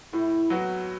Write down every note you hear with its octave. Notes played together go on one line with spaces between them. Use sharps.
A2 E4
F#3 B3 F#4